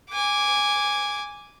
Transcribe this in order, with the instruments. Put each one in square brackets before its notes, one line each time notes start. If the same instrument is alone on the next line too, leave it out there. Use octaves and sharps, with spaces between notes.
[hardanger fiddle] G#5 D6